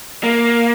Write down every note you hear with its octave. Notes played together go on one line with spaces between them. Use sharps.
A#3